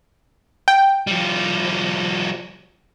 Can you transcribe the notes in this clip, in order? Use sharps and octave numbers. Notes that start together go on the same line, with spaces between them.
G5
F3 G3